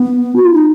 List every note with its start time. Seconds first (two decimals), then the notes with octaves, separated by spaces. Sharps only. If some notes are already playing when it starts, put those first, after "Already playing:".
Already playing: B3
0.36 F#4
0.45 F4
0.53 D#4